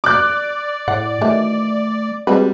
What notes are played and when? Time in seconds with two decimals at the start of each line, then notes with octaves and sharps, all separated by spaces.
0.04 D5 D6 F#6
0.88 A2 F#5
1.21 D#3 E3 F#3 A3
2.27 G3 G#3 C4 F#4 B4